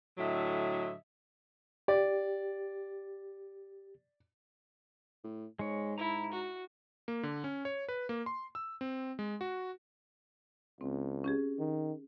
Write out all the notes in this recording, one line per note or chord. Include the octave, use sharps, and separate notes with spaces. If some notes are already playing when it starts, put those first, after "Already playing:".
A2 D3 F#3 D#5 E5
G4 D5
A2
G#2 G#3 C#5
E4 A#5
F#4
A#3
D3
C#4
C#5
B4
A#3
C6
E6
C4
G#3
F#4
C#2 C4
C#4 G4 G#4
D#3